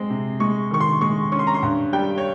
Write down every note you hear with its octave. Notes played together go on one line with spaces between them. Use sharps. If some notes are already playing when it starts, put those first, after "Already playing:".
Already playing: G#3 C4
C3
G#3 C#6
D#3 C#6
C6
G#3 C#6
C#4 C#6
C6
A#5
C6
G2
G3 G5
C#5